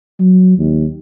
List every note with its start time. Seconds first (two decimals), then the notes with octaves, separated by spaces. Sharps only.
0.19 F#3
0.58 D#2